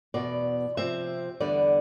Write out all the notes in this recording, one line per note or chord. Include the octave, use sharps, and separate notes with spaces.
E2 B2 B3 D5
C3 F3 C4 E5
E2 D3 G3 B3 D5